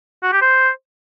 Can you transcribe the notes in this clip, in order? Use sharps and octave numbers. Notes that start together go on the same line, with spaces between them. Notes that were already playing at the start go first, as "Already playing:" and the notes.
F#4
G4
C5